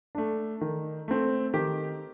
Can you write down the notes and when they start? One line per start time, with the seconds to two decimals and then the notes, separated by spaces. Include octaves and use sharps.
0.15 A3 D4
0.61 D#3
1.08 A3 C4
1.54 D#3 G4